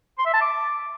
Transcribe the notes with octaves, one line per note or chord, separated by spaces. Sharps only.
C6
E5
A5
D6